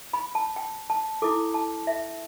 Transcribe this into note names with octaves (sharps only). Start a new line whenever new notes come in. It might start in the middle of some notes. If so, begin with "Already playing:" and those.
B5
A5
G5
A5
E4 A4 D6
A5
E5